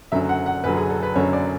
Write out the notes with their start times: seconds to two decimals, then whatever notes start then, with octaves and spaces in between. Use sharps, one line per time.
0.12 F#1 F#2 D3 F#3 E5
0.29 F#5
0.46 F#5
0.64 F#1 F#2 D3 F#3 B4
0.77 G#4
0.90 A4
1.03 B4
1.15 F#1 F#2 D3 F#3 C#5
1.33 D5